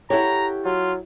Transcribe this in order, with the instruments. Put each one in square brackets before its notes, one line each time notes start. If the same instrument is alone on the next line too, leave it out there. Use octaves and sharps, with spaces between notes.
[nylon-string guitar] E4 A4 C#5 [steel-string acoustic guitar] G4 F#5 [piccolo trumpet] A#5
[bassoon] F#3 [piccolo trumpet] F4